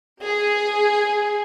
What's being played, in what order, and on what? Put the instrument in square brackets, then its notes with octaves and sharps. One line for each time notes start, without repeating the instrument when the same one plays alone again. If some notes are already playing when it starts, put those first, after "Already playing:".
[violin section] G#4